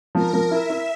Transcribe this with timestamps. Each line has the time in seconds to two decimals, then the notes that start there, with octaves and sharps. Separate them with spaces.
0.15 F3 A#4
0.33 F3
0.51 E4 E5
0.70 E4